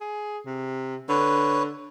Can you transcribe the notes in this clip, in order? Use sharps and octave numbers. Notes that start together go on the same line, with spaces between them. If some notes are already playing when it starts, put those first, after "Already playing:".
G#4
C3
D3 B4 C#5